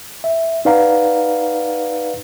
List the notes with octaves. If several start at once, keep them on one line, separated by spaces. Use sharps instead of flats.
E5
D#4 B4 D5 F5 F#5 A#5